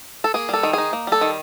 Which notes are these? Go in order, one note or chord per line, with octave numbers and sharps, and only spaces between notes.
A4
A#3 G#4
G3 A4
D#3
D#4 G#4
A#3
G3 A4
D#3